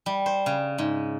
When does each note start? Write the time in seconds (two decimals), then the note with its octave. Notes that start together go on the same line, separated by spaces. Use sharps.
0.06 G3
0.26 C5
0.46 C#3
0.78 G#2